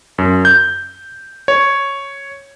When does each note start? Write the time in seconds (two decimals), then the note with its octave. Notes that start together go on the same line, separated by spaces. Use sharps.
0.18 F#2
0.45 G6
1.48 C#5